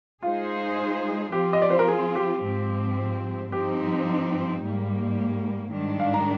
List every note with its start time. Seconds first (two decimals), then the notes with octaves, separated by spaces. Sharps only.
0.23 G#3 D#4 F4 G#4 C5
1.32 F3 C4 F4 G4
1.53 D#5
1.62 D5
1.70 C5
1.79 A#4
1.88 G#4
2.15 G4
2.43 G#2 F3 C4
3.52 G2 F3 C4 D#4 G4
4.62 G#2 G3 A#3
5.72 G#2 D#3 G3 D4
6.00 F5
6.14 A#5